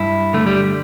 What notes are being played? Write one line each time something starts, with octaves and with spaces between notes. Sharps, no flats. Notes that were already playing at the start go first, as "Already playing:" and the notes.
Already playing: G2 E4
D3 A3
G3